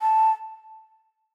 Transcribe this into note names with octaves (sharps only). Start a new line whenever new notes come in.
A5